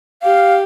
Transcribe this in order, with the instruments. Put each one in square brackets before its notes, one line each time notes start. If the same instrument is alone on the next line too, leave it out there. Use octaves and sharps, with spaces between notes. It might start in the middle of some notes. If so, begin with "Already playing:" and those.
[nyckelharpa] G4 [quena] F5